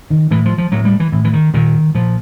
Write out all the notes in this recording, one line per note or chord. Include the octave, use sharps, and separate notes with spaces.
D#3
A2 E3
F3
F3
A2 F#3
G3
E3
A2 E3
E3
D#3
A#2 D#3
A#2 F3